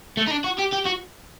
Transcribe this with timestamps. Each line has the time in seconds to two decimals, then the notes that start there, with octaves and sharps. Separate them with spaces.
0.17 A3
0.27 D#4
0.31 D4
0.44 F#4
0.59 G4
0.73 G4
0.86 F#4